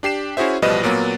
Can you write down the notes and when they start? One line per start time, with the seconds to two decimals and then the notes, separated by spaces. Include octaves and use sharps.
0.03 D4 G4 C7 E7
0.37 C#4 E4 F#4 G#4 C5 E5
0.62 A1 B2 F3 G3 B4 D#5
0.84 A#2 F#3 A#3 B3